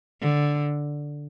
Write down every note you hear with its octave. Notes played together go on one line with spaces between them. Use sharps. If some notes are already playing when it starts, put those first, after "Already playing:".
D3